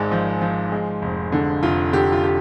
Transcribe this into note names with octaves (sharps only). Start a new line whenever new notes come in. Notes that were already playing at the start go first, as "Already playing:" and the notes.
Already playing: G#1 G#2 D5
F3
F3
G#3
F1
D3
F1 F4
D3 G4
F4
G4